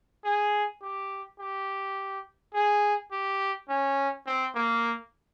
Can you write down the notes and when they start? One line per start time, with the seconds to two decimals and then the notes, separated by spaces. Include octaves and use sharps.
0.25 G#4
0.82 G4
1.39 G4
2.54 G#4
3.12 G4
3.69 C#4
4.27 C4
4.55 A#3